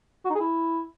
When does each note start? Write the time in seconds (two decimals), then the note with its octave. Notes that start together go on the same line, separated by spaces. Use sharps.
0.25 F#4
0.30 D#4
0.35 G#4
0.40 E4